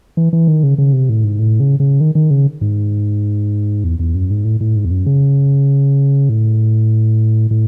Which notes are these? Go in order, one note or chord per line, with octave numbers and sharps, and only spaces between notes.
E3
E3
D#3
C#3
C#3
C3
A2
G#2
A2
C#3
C#3
D#3
D#3
C#3
G#2
E2
E2
F#2
G#2
A2
A2
G#2
E2
F#2
C#3
A2
A2